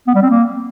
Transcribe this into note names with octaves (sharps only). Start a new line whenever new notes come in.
B3
G3
C4
A#3